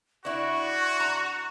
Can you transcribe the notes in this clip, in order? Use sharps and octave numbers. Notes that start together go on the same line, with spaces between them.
D4 E4 F#4 C#6
A#5